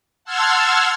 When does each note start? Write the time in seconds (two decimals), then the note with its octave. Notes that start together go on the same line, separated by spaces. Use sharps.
0.24 F#5 A5 C6 E6 F6 G#6